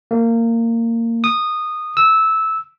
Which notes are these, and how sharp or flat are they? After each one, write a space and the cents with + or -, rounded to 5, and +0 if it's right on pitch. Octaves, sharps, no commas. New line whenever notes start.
A#3 -20
D#6 -15
E6 -15